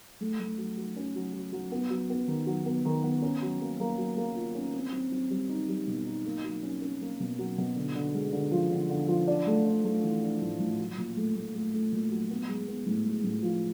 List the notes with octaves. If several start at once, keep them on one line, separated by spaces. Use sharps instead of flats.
A3
A3
F#3
F#3
C#4
F#3
F#3
F#3
B3
F#3
B3
D#3
F#3
B3
D#3
B3
C#4
F#3
A#3
A#3
F#3
A#3
F4
C#4
C4
C4
C4
G3
D#4
G3
B2
D#4
A#3
F#3
C#4
C#4
A#3
B2
F#3
B2
D3
D3
G#3
D3
F3
D3
D3
F3
D4
A3
D4
A3
E3
D4
A2
A2
F#3
A#2
A3
A3
A3
A3
A#2
F#3
B3
G#3
B3
A2
G#3
A2
F3